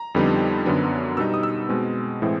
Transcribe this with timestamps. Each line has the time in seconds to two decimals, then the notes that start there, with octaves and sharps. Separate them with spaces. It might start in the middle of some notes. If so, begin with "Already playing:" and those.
Already playing: A#5
0.15 F2 D3 G3 B3 D#4
0.66 F#2 D3 F#3 B3
1.17 B2 G3 B3 D#4 E6
1.34 D#6
1.43 E6
1.69 B2 G#3 C4
2.22 A2 E3 G#3 C4